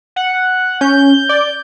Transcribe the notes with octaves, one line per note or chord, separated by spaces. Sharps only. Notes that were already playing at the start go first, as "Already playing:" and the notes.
F#5
C#4 G6
D5